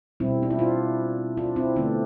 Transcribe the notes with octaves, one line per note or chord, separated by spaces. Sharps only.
B2 G3 C4 E4
D4
E4
D4 F4
D4 F4
C4 E4
D3 A3 B3 D4